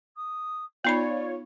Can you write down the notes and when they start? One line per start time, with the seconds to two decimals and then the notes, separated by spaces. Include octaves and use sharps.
0.16 D#6
0.84 B3 D#4 F4 C#5 D5 B5